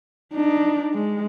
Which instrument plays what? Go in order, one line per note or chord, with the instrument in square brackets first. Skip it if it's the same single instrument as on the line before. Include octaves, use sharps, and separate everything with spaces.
[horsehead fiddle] D4 D#4
G#3